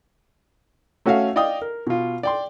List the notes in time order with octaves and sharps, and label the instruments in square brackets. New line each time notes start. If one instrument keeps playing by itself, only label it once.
[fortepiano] A3 C#4 F#4 E5 F5
D5 D#5 F5 G5 D#6
A#4
B2 F4
D5 G5 C6